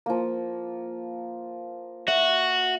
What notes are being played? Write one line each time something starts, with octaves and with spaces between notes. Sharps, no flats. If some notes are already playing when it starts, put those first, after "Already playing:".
F3 A#3
F#4 E5